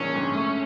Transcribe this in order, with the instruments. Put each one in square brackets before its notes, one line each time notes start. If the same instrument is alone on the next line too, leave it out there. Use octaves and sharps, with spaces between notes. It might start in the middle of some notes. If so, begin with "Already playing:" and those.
Already playing: [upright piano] A#1 D3 D#3 G#3 [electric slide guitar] C#4
[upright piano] G#2
A3